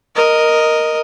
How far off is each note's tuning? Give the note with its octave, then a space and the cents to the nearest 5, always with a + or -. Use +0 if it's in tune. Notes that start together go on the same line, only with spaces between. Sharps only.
A#4 +0 D#5 +0